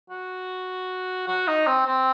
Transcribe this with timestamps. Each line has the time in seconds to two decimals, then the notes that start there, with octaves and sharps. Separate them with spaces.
0.10 F#4
1.28 F#4
1.47 D#4
1.67 C4
1.86 C4